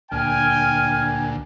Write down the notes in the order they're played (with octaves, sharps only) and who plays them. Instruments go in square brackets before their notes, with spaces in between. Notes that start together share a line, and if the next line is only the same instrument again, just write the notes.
[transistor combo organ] D2 A#2 [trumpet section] G5 G#5 [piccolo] F6